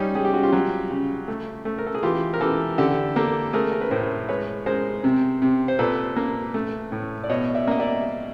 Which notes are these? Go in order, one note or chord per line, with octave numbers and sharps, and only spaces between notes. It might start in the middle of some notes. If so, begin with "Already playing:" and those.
Already playing: G3 C#4 D#4
G3 G#4
G4
F#4
F4 G4
F#3
C#3
A3
A3
A#4
A4
G#4
E3 F4 G4
A#4
E3 G4 A4
D3 G4 A4
A#3 G4 A4
A3 G#4 A#4
A#4
B4
A2 A#4 C5
G#3 B4 C#5
G#3 A#4 C5
C3
C3
C5
A#2 A4 B4
A#3
A3
A2
D5
B2 C#5 D#5
D5 E5
A#3 D#5
D5 E5